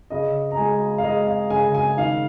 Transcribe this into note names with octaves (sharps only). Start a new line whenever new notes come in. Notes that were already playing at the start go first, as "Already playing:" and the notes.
C#3 D#5
A#5
G#3 G#5
F5
G#3 D#5
F5
C#3 G#5
G#5
D#3 F5